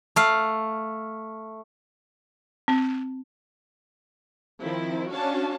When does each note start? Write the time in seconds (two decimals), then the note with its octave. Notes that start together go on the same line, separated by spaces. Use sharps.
0.16 A3 F5
2.68 C4
4.61 D#3 F3 C4 E4
5.10 C#4 D4 F#4 C#5 F5 A5